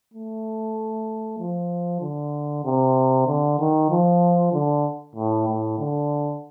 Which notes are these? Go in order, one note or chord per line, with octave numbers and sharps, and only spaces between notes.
A3
F3
D3
C3
D3
D#3
F3
D3
A2
A2
D3